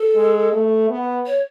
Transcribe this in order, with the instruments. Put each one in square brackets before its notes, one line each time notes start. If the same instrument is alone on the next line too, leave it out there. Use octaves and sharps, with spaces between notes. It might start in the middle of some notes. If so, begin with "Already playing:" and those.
Already playing: [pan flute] A4
[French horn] G#3
A3
B3
[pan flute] C#5